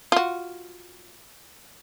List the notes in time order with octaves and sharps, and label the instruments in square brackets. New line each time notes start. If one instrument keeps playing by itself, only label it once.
[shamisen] F4 F#4